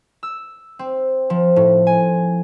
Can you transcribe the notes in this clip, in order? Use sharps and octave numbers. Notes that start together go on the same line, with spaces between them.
E6
C4
F3
A2
G#5